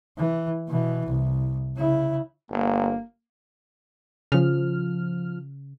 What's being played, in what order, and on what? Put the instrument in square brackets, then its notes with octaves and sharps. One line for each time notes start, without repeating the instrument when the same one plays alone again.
[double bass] E3
B2 E3
C2
C#3 E4
[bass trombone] G1 [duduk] A#3
[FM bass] C#3 [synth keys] F3 F6